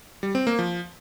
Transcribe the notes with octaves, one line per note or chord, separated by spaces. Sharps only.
G3
C4
A#3
F3